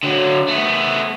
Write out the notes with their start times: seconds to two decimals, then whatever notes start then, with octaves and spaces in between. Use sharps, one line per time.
0.03 D3 F#3
0.48 A3 B3